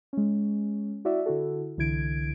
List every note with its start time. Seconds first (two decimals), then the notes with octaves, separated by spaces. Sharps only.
0.13 G#3 C#4
1.05 E4 F#4 D5 E5
1.26 D3 E4 F#4 A4
1.77 C2 D3 E3 E4 G#6 D7